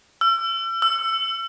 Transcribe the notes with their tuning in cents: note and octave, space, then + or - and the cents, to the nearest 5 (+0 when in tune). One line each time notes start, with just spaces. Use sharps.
E6 +40
E6 +25